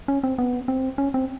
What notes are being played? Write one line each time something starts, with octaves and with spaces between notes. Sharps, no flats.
C#4
C4
B3
C4
C#4
C4